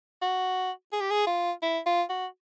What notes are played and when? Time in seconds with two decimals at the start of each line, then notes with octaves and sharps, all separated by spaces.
0.22 F#4
0.93 G#4
1.01 G4
1.11 G#4
1.27 F4
1.62 E4
1.86 F4
2.10 F#4